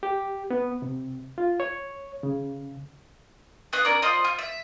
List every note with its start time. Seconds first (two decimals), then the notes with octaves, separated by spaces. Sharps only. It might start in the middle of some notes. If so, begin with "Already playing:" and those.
0.03 G4
0.50 B3
0.82 C3
1.38 F4
1.60 C#5
2.23 C#3
3.73 B3 F4 D#5 F#6
3.85 C#4 A#4 D5
4.02 F4 C5 D5 D#5
4.25 F4
4.38 E5